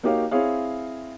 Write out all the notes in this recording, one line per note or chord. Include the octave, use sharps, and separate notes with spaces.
A#3 D#4 F#4 G4 C#5 F5
C4 E4 G#4 C#5 F5